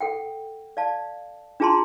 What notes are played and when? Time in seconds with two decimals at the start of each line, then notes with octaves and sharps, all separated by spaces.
0.01 A4 F#5 G5
0.77 D5 F5 A5
1.60 D4 F4 G#4 A5 A#5 C6